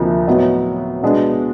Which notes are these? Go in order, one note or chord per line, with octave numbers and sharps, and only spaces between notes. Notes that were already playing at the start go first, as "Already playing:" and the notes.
Already playing: D2 C3 F3 A#3 D#4
A2 F#3 B3 D#4
B2 G#3 B3 D4 F#4